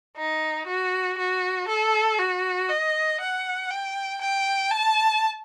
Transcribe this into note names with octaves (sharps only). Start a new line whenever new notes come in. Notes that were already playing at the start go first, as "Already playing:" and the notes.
D#4
F#4
F#4
A4
F#4
D#5
F#5
G5
G5
A5